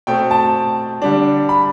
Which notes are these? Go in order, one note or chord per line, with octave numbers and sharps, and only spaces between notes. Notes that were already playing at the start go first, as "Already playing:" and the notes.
B2 A3 C4 G5
A5
D3 G3 D4
B5